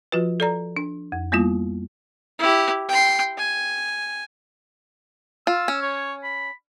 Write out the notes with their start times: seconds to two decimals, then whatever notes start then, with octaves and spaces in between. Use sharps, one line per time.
0.12 F3 F4 F#4 B4
0.40 A4 D5 A#5
0.77 D4
1.12 F2
1.32 G3 A#3 B3 E4 F4
2.39 E4 G4
2.89 G5 C6
3.38 G#5
5.47 F4 E6
5.68 C#4
5.82 C#5
6.24 B5